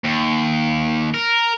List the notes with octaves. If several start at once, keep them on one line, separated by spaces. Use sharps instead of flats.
D#2
A#4